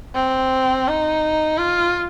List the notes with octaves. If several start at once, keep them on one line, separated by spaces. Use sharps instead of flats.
C4
D#4
F4